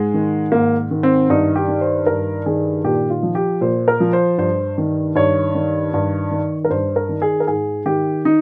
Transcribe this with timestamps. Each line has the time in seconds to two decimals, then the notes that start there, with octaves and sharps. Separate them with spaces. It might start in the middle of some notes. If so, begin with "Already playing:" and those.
Already playing: G#2 G#3
0.14 D#3
0.52 G#2 A#3
0.91 D#3
1.03 C4
1.29 G2 D#4
1.56 G4
1.68 D#3
1.81 C5
2.06 G2 A#4
2.46 D#3 G#4
2.84 A#2 G4
3.10 F4
3.23 F3
3.35 G4
3.61 A#2 C5
3.88 A#4
4.00 F3
4.13 C5
4.38 G2 C5
4.78 D#3
5.15 G2 C#5
5.55 D#3
5.94 G2
6.31 D#3
6.65 A#4
6.70 G2 C5
6.96 A#4
7.09 D#3
7.22 G#4
7.40 A#4
7.47 G#2 G#4
7.86 D#3 G4
8.25 D#4